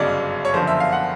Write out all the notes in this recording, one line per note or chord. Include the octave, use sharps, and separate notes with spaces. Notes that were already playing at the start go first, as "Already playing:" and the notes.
Already playing: G1 F#2 C#3 F#3 D5 D#5
C#5
F#1 F2 D3 F3 C5
E5
F5
F#5